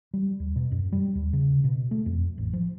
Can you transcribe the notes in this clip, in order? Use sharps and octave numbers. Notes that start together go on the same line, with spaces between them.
G3
D#2
B2
F#2
G3
D#2
C#3
B2
A3
F2
A1
F3